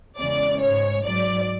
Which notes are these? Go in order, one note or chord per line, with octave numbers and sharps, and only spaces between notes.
E2 C#3 G#3 D5
G#2 G#3 C#5
G#2 F#3 D5